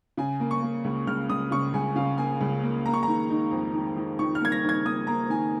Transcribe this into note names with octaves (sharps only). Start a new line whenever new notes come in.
C#3 G#5
A#3
C#6
A#3
C#2
C#2 F6
C#2 D#6
C#3 C#6
C#2 G#5
C#3 F5
A#3 G#5
C#2
A#3
A#3 A#5
C#6
D#3 A#5
D#4
F2
D#3
D#3
D#3 C#6
F6
A#3 G#6
A#6
D#4
G#6
A#3 D#6
A#3 A#5
D#3 G#5